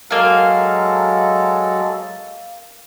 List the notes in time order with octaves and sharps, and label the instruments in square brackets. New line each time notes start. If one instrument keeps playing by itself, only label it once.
[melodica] F#3 G#3 A4 [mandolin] A#3 F5